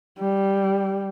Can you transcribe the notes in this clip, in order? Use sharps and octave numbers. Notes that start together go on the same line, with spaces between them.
G3